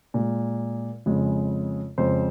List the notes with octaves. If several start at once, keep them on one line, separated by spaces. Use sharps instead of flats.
A#2 G#3
F2 C#3 G#3
F2 C#3 G#3 C5